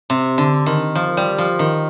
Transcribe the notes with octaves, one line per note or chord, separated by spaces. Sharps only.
C3
D3
D#3
F3
G3
F3
D#3